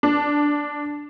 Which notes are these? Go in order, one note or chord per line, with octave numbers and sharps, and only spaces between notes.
D4